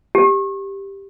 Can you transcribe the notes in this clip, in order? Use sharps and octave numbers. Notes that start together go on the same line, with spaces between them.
G4